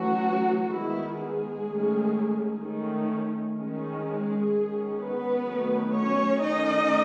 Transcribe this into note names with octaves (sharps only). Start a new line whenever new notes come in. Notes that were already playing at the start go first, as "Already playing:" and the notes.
Already playing: E3 F#3 A3 C#4 F#4
D#3 G#3 B3 E4
G#3 G#4
D#3 A3 C#4
D#3 A3 C#4
D#3 G#3 C#4
G#3 G#4
D#3 G#3 C#4
B3 B4
D#3 F#3 A3 C#4
C#4 C#5
D#3 A3 C#4 D#4 D#5